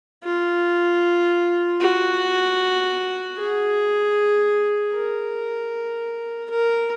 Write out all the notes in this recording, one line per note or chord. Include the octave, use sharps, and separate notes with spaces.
F4
F#4
G#4
A#4
A#4